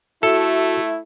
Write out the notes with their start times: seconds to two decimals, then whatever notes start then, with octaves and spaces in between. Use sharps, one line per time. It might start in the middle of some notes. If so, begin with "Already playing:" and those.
0.23 A3 E4 F#4 A4